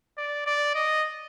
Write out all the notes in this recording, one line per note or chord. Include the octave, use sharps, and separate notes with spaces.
D5
D5
D#5